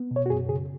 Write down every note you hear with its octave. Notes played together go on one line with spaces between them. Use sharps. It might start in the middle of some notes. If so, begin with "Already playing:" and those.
Already playing: B3
B2
C#5
F#4
F#2 G#4
C#3 G#4